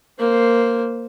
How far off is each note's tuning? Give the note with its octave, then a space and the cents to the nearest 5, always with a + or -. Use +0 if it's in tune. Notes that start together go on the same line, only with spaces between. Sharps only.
A#3 -5 C5 +0